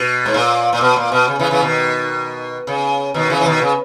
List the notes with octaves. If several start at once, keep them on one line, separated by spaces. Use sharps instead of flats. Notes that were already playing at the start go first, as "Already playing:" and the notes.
Already playing: B2
G#2
A#2
A#2
B2
A#2
B2
C#3
C#3 E3
C#3 E3
B2 D#3
C#3
B2 D#3
C#3 E3
E3
B2 D#3
C#3